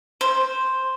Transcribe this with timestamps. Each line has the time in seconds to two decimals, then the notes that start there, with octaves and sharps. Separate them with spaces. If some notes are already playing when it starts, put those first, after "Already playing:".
0.21 C5